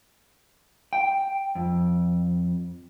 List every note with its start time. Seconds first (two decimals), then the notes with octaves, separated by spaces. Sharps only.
0.93 G5
1.55 F2